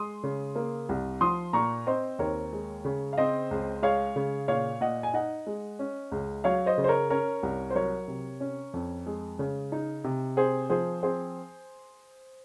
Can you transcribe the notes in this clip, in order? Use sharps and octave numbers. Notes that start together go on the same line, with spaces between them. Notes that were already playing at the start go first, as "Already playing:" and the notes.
Already playing: G#3 C6 D#6
C#3
A#3
C2
F3 C6 D#6
A#2 A#5 C#6
C4 C5 D#5
D#2 A#4 C#5
G#3
C#3
F5
C4 C5 D#5
C#2
G#3 C#5 F5
C#3
A#2 C#5 F5
A#2 D#5 F#5
G#5
D#4 D#5 F#5
G#3
C#4
C#2
F#3 C#5 F5
C5 D#5
C#3
C5
A#4 C#5
C#4 A#4 C#5
C2
C5
F#3 A#4 C#5
C3
C#4
F2
G#3
C#3
D#4
C3
C4 G#4 C5
F3 G#4 C5
C4 G#4 C5